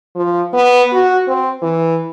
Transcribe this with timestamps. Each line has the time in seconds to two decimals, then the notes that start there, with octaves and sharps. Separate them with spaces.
0.16 F3
0.54 B3
0.93 F#4
1.28 C4
1.62 E3